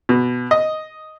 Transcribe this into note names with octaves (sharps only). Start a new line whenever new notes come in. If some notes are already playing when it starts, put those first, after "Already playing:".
B2
D#5